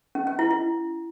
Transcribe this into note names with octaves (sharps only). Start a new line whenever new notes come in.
C#4
C#4
E4
E4